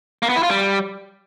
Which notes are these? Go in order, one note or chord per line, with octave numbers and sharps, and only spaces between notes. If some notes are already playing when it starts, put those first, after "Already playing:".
A#3
B3
E4
F4
G3